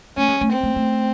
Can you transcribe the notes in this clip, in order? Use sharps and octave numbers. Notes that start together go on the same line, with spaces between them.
A3 C#4
G#3
A3
C4
A3
A3